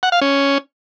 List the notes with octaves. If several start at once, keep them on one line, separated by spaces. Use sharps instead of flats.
F#5
F5
C#4